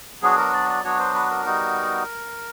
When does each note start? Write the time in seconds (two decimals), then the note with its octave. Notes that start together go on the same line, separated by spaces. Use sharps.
0.22 F#3 B3 D4 F#4 G#4
0.37 A#4
0.54 D5
0.69 D5
0.84 F#3 B3 D4 F#4 C#5
0.99 C5
1.15 B4
1.30 A#4
1.45 G3 B3 D#4 F#4